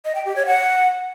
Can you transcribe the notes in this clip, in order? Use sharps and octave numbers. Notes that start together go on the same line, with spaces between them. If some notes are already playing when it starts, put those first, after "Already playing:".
D#5
G5
G4
C#5
F#5